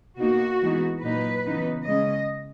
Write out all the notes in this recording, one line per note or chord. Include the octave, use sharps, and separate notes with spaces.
B2 A#3 D#4 F#4
E3 G#3 B3 D#4
A#2 F#3 A#3 D#4 B4
C#3 E3 B3 D#4
C#3 G#3 C#4 D#5